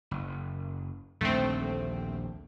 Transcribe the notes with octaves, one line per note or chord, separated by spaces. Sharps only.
F#1
A#1 D#2 D3 A3 C4